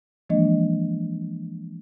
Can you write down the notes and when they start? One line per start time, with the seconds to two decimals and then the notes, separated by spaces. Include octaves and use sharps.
0.30 E3 F3 G#3 A#3 D4 D#5